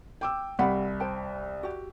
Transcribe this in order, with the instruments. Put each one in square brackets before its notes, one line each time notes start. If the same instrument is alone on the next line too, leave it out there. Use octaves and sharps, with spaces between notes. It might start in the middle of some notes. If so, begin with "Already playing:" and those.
[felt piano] G5 D6 E6
[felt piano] C2 B5 [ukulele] G4 F5 F#5
[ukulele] C5 G5 A5
F#4 G4